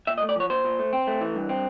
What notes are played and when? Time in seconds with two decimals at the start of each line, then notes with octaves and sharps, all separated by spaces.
0.07 A#2 E5
0.18 D#5
0.22 A3
0.29 D5
0.36 F3 C#5
0.50 A#2 C5
0.65 A#2
0.79 A3
0.93 C4
1.07 A3
1.21 E3
1.35 G2
1.49 C4